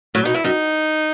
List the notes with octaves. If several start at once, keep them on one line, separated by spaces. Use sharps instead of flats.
A2 F#3
B2 D#4
G2 E4
F#2 D#4